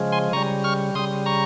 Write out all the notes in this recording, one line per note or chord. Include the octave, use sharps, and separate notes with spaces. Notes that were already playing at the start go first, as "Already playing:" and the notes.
Already playing: C#3 F3 G#3
G#5 C6
C#3 G3 A#5 C#6
C#6 F6
C#3 G3 C6 D#6
A#5 C#6